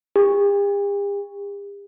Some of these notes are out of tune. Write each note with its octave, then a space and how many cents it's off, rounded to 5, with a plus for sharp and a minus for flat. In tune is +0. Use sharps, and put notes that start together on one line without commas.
G4 +45